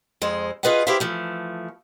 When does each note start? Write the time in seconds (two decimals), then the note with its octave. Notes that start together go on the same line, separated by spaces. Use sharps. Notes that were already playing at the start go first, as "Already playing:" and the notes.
0.22 F2 G#3 C5
0.63 F4 G#4 B4 D#5 F5 F#5
0.87 E4 G4 G#4 C5 E5 F5
1.00 E3 F3 A3